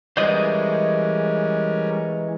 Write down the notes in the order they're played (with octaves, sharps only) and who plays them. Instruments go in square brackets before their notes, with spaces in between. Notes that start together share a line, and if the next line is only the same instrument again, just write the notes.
[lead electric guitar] E3 G#3 [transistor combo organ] G3 C#4 A#4 [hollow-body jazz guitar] C5 D5 D#5